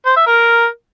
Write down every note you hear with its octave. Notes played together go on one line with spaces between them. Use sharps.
C5
E5
A#4